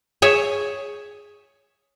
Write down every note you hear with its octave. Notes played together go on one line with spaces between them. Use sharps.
G#4 C#5 E5